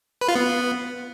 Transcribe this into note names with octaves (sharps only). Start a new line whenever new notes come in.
B4
F4
B3